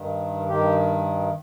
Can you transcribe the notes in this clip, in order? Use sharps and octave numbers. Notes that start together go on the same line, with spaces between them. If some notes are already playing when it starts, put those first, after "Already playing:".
Already playing: G2 D#3
G2 D#3 G4